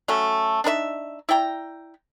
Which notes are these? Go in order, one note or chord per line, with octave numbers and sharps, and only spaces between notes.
F#3 A3 C#4
D4 D#4 A#4 E5
E4 D5 G5 A#5